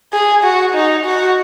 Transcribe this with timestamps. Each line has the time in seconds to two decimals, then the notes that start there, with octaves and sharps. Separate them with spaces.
0.13 G#4
0.44 F#4
0.74 D#4
1.05 F#4